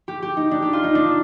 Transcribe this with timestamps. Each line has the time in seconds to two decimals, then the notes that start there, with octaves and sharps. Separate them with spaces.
0.08 G4
0.22 G4
0.37 D#4
0.51 D4
0.62 G4
0.73 F4
0.84 D#4
0.95 D4